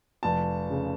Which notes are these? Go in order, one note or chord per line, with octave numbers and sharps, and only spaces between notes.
F1 A5
C#3